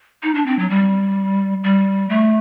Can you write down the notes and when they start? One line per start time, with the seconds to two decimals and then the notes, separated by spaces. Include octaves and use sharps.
0.23 D#4
0.35 D4
0.46 C4
0.59 F#3
0.70 G3
1.64 G3
2.09 A3